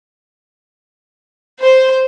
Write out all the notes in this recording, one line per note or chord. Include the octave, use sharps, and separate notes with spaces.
C5